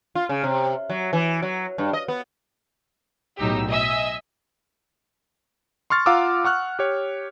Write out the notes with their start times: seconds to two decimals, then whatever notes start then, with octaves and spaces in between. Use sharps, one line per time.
0.15 F4
0.29 C#3
0.44 C3
0.90 F#3
1.13 E3
1.42 F#3
1.78 G2
1.93 D#5
2.08 B3
3.38 B1 A2 F#3 D#4 G4 E6
3.69 D#5 E5 G#5 E6
5.90 C6 C#6 F6 A6
6.06 F4 F5 F#5 A#5 D6 E6
6.45 F#5 C#6 F6 F#6
6.79 G4 C#5